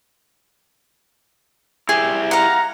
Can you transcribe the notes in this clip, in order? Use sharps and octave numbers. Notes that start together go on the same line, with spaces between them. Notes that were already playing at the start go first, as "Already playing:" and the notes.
E4 G4 G#4
F5 F#5 A#5